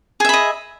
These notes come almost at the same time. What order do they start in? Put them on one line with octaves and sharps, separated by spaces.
G#4 E5 B5 D#5